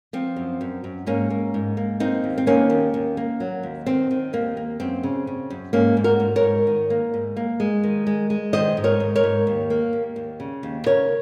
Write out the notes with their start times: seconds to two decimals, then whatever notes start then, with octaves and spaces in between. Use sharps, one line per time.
0.13 F3 C4
0.36 F#2
0.61 F#2
0.84 F#2
1.06 G#2 A#3 C#4
1.30 A#3
1.54 G#2
1.77 A#3
2.00 A#3 C4 D#4
2.24 D#2
2.38 C4
2.47 D#3 A#3 C#4
2.70 D#2
2.94 D#2
3.17 A#3
3.40 F#3
3.63 D#2
3.86 D#3 C4
4.11 D#3
4.33 D#2 A#3
4.57 A#3
4.80 F#2 C4
5.03 C#3
5.27 C#3
5.50 F#2
5.73 G#2 A#3 C#4
5.97 G#2
6.04 F#4 A#4
6.20 G#2
6.36 A#4 C#5
6.43 G#2
6.67 D#3
6.90 A#3
7.14 G#2
7.37 A#3
7.60 G#3
7.84 D#3
8.07 G#3
8.30 G#3
8.53 D#3 C5 D#5
8.77 G#2
8.84 A#4 C#5
9.00 G#2
9.15 A#4 C#5
9.23 G#2
9.47 D#2
9.70 A#3
9.93 D#2
10.16 D#2
10.40 C#3
10.63 D#2
10.86 C#3 A#4 C#5